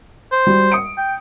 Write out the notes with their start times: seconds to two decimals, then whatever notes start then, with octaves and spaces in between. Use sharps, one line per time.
0.32 C5
0.47 G3 F#4
0.72 D#6 C#7 D7
0.97 G5